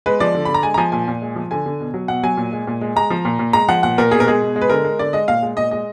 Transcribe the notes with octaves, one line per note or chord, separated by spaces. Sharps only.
G#3 B4
F3 D5
D3
D3 B5
A#5
G#3 G#5
A#5
F3 G#5
A#2 G#5
A#2
G#3
F3
D3 G#5
D3
B2
F#3
B2 F#5
F#3 G#5
A#2
G#3
A#2
G#3
G#3 A#5
F3
A#2
A#2
G#3 A#5
F3 F#5
A#2 F#5
A#2 A#4
B2 G#4
A#4
G#3 G#4
B2
G#3
B4
D3 A#4
G#3
D3 D5
G#3 D#5
A#2 F5
G#3
A#2 D#5
G#3 D#5